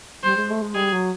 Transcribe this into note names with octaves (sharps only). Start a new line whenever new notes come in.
G3 C5
G#3
A3
G#3
G3 G#4
F#3